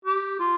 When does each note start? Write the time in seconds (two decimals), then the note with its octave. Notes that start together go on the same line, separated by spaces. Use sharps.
0.05 G4
0.39 F4